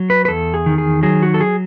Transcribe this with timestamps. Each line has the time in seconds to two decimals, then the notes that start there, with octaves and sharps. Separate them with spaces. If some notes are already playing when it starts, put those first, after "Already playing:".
Already playing: F#3
0.10 B4
0.25 B4
0.28 E2 A4
0.54 G#4
0.66 D#3
0.78 G#4
1.03 F#3 G#4
1.23 F#4
1.34 A4
1.40 G#4